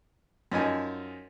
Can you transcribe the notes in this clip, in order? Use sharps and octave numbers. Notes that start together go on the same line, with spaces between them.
F#2 F3 D#4 G#5